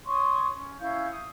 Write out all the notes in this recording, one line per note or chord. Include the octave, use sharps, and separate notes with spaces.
C#5 C6 C#6 D#6
C#4
C#4 E4 F5 G6
D#6